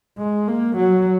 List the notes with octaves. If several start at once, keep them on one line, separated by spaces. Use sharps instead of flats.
G#3
A#3
F#3